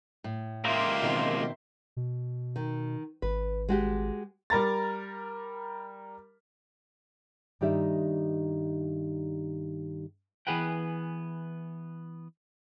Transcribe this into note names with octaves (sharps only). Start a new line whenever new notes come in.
A2
C#2 A#3 F4 G4 A#4 E5 C6
B2 D#3 C4
B2
D#3
G#1 B4
G#3 F#4 G4
G3 A#4 A#5 A6
G2 D#3 D#4 G4 D5 E5
E3 B3 G#4 B4 F#5 G5